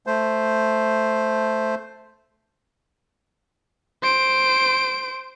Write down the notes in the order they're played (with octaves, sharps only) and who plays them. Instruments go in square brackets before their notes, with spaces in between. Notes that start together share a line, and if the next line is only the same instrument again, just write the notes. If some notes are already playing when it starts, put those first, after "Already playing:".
[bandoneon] A3 C5
[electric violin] C5 D7